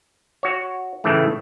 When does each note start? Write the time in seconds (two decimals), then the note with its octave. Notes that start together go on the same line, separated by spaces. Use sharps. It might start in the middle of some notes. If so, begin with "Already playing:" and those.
0.43 F#4 C#5
1.04 A2 C#3 E3 A3